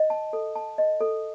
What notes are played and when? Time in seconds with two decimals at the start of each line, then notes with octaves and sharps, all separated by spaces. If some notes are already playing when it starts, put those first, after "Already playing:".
Already playing: D#5
0.10 A5
0.33 A4
0.56 A5
0.78 D#5
1.01 A4